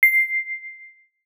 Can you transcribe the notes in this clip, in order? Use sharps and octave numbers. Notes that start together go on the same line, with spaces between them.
C7